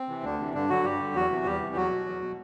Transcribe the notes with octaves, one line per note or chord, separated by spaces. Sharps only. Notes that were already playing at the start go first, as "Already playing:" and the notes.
Already playing: C4
C3 E3
D2 D3 D4
C3 E3
G2 D3 D4
D3 F#3 F#4
G2 G3 G4
D3
E2 F#3 F#4
C3 E3
E2 G3 G4
C3 E3
E2 F#3 F#4
B2
E2
B2